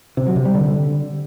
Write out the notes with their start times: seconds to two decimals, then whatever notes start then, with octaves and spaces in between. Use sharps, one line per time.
0.17 C3
0.26 F#3
0.36 C3
0.45 G3
0.54 D3